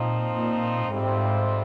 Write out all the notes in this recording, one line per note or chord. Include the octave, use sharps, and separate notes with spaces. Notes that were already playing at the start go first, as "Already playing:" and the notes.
Already playing: A#2 F3 C4 D#4
A#2
F2 G#2 C3 G3 C4 F4